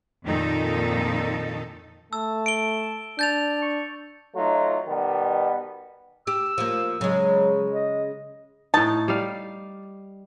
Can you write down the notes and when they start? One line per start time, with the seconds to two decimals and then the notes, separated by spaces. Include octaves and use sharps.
0.24 F2 A#2 D#3 D#4 A4
2.13 A3 A5 E6
2.46 D7 G7
3.19 D4 A5 G6 A6 F7
3.62 C#6
4.34 F#3 A3 D#4 F4
4.86 B2 D#3 G3 B3
6.27 G4 E6
6.58 F3 A#3
7.01 C#3 F#3 G#3
7.72 D#5
8.74 A2 D#4 A5
9.08 G3 F5